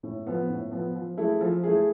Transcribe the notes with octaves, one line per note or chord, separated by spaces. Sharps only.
A2
F3 B3
A2
F3 B3
F3
A3 E4 G#4
F3
A3 E4 G#4